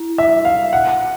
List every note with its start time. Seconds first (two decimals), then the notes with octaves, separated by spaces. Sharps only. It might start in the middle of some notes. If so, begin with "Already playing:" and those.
Already playing: E4
0.18 E5
0.45 F5
0.73 F#5